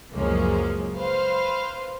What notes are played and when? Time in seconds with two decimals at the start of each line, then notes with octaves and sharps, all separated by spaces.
0.12 C#2 F#2 F3 G#3 A#3 C#4
0.96 B4 C5 F5